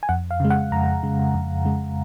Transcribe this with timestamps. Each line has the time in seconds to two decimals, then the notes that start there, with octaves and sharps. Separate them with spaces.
0.03 G#5
0.09 F2 F#5
0.31 F5
0.40 C#3 G#3
0.50 F#5
0.72 F2 A#5
1.03 C#3 G#3
1.34 F2
1.65 C#3 G#3